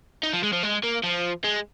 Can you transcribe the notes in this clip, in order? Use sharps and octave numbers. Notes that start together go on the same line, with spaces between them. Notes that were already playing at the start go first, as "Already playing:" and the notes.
D#4
F3
G#3
F3
G#3
A#3
F3
G#3